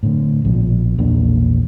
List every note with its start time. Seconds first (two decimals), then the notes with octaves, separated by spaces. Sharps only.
0.03 A2 D3
0.45 A#1 B2 F3
0.98 A#1 E2 A#3 D4